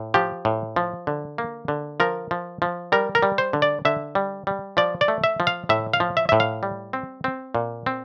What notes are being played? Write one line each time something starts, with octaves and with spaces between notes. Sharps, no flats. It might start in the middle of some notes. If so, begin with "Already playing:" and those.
Already playing: A2
F3 G4
A2
F3
D3
A#3
D3
F3 A#4
F3
F3
G3 A#4
A#4
G3
C5
D3
D5
D3 E5
G3
G3
F3 D5
D5
A3
E5
F3
F5
A2 E5
F5
F3
E5
A2 E5
F5
G3
C4
C4
A#2
C4